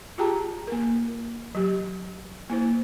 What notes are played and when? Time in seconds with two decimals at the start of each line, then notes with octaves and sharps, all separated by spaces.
0.18 F4 G4 G#4 G5 A5 A#5
0.67 A#3 A#4
1.55 F#3 G4
2.50 A#3 E4 C5